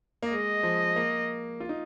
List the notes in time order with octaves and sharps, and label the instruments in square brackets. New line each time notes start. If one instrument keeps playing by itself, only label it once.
[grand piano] A#3
[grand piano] G#3 [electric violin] D#5
[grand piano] F3
A#3
F4
D#4